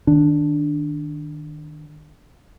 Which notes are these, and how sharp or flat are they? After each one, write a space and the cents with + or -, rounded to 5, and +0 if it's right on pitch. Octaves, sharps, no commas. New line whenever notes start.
D#3 -20 D4 +0